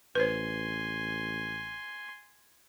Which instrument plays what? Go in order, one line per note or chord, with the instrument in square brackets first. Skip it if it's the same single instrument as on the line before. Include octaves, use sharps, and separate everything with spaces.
[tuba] A1 [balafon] B4 C5 [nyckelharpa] G#5 C6